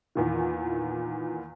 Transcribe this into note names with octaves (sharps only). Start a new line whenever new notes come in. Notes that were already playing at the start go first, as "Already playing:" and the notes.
E2 A#2 D#3